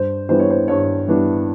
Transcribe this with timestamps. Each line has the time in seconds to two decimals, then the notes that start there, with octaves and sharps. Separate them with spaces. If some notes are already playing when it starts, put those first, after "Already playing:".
Already playing: G2 C5
0.29 E3 G3 B3 D4 C5
0.40 C#5
0.50 C5
0.68 G2 C#5
1.08 E3 G3 B3 D4